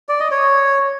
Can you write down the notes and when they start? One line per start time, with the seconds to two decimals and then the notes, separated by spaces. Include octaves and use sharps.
0.09 D5
0.20 D#5
0.31 C#5